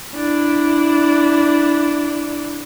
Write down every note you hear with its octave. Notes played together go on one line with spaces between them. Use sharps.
D4 E4